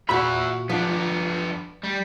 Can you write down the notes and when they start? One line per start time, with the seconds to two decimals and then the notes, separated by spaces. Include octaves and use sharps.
0.09 A#2 F#4 E5 F#5 B5
0.70 F3 B3 D4 F4
1.83 G3